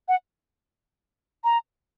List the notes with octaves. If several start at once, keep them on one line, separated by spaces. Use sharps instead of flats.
F#5
A#5